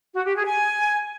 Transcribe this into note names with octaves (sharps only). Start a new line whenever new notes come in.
F#4
G4
G#4
G#5